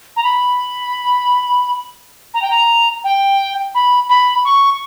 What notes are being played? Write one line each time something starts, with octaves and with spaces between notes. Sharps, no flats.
A#5
B5
A#5
G5
A#5
G5
B5
B5
C#6